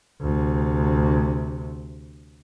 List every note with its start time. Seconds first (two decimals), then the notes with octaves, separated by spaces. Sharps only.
0.22 D2 C3